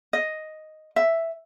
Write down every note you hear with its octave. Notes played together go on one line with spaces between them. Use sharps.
D#5
E5